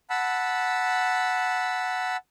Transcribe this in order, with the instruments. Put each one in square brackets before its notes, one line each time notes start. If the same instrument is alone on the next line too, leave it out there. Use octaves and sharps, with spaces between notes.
[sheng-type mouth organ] F#5 A5 B5 E6